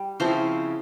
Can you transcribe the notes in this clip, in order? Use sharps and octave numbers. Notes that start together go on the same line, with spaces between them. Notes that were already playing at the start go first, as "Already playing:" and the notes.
Already playing: G3
C#3 F3 C4 E4 C5